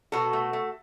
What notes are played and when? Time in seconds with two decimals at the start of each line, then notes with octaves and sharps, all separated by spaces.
0.12 B2 F#4 A4
0.33 A3
0.53 A3